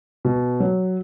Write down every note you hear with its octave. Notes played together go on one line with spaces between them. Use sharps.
B2
F#3